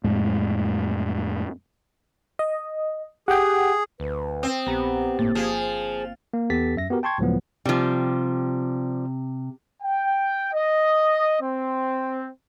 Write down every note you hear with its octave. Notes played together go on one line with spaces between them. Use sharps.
F2 A2 G#3
D#5
G4 G#4 F#5 G5
D2 B4
C4 D#6
A#1 B3 G4 A#5
G1 A2 A#3 A6
F3 G#4
C5
A#3
E2 B3 G4 A4 A6 B6
F#2 E5 A#6
B3 F#4 G4 A#4
G5 A5 C6 C#6 G#6
C#2 A2 F3 F#3 B3
C3 F3 G3
G5
D#5
C4